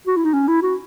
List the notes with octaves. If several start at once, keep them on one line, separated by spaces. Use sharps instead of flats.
F#4
E4
D#4
C#4
E4
F#4